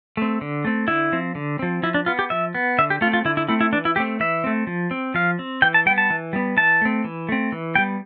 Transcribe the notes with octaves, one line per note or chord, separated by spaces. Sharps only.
A3 C4
D3
A3 C4
D3 E4
F3 C4
D3
F3 C4
F3 E4
D4
B3 F4
G4
F3 E5
B3
D3 E5
G4
A3 F4
C4
F4
D3 E4
E4
A3 C4 E4
E4
E3 D4
E4
A3 C4 G4
E3 E5
A3 C4
F3
C4
F3 F5
C4
E3 G5
A5
G3 B3 G5
A5
E3
G3 B3
E3 A5
A3 C4
E3
A3 C4
E3
G3 B3 G5